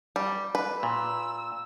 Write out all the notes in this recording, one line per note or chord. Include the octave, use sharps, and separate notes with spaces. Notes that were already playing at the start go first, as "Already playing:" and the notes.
G3
B4
A#2 E6